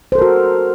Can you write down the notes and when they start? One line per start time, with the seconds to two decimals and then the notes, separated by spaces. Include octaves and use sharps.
0.12 C5
0.15 A4
0.18 A#4
0.22 F#4